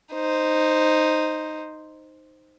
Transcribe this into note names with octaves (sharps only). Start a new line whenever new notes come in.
D#4 C5